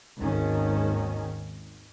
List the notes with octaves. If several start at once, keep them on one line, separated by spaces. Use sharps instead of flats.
G#1 D#2 D#3 C#4